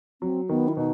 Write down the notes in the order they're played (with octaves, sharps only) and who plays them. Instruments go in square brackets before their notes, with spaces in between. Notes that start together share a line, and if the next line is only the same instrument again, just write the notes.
[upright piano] F#3 [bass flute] C4
[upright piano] D#3 [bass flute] B3
[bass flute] E4
[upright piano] B2 [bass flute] D#4